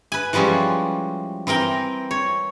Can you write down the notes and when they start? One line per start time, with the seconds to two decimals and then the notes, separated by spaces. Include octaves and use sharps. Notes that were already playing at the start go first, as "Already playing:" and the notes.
0.12 B4 G#5
0.33 E3 F3 G3 G#3 C#4
1.47 E3 C4 A#4 G5
2.11 C#5